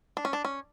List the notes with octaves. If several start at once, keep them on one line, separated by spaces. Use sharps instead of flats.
D4
C#4
D4
C#4